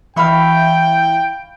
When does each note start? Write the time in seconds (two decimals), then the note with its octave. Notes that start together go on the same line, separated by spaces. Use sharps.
0.16 E3 E4 E5 F5 G5 B5 C#6